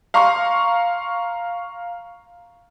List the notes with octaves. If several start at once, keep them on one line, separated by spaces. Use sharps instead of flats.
F5 A#5 C6 C#6